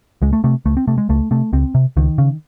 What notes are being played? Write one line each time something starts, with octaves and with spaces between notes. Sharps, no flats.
C#2 G#3
A3
C3 A3
C#2 A3
C4
C3 A3
G#3
C#2 A3
C3 A3
C#2 C4
C3
C#2 D#3
C#3